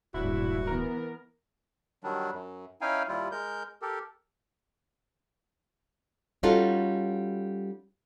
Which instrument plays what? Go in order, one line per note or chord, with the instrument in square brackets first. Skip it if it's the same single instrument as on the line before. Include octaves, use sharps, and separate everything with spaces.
[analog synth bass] D1 [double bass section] A#1 G2 [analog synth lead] E4 [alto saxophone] F#4
[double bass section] E3 B3 [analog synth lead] A#4
[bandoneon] D#3 F#3 G3 D4
F#2
C#4 D#4 E4 F5 G5 G#5
D#2 G3 E4 F4
G#3 A#4 G6
G4 A4 A#4
[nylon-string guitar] G3 C#4 D#4 F4 F#4 A4